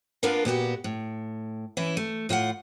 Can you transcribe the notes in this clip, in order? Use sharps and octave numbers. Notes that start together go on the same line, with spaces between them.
A#3 B3 D4 F4 A#4 B4
A#2 B3 F#4 G4
A2
E3 C#4 E4
A3
A2 F4 F5 F#5